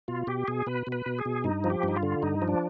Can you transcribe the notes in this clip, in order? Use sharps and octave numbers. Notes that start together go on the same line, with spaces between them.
B2 F4
B2 G4
B2 G#4
B2 B4
B2
B4
B2
G#4
B2
G2 D#4
F3
G4
G2 D#4
F4
D3
G2 D#4
F3
D4